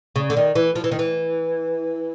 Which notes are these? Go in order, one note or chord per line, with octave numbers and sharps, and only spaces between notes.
C#3
D3
D#3
E3
F3
E3
D#3
E3